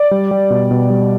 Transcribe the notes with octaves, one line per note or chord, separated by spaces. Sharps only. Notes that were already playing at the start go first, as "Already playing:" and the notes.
Already playing: D5
G3
G3
B2
B2
G3